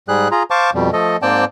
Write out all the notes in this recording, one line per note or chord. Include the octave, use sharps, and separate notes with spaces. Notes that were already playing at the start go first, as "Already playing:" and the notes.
G#2 G3 G#4 F#6
F4 G#4 A#5
C5 F5 A5 C#6 D6
F2 B2 G3
F3 A3 A4 D#5
G#2 A#3 C4 D5 G5 A5